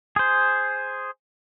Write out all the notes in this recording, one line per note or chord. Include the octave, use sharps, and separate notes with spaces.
G#4 C5